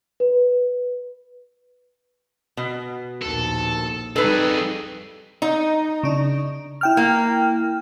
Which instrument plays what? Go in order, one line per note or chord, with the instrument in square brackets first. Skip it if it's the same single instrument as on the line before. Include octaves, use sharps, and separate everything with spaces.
[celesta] B4
[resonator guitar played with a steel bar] B2
[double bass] A#1 D#2 [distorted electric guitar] A4
[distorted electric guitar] F2 G#4 [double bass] G3 D#4 [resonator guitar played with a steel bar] A4 B4
[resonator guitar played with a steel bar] D#4
[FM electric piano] C#3 D4
E4 G5 F6
[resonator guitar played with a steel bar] A#3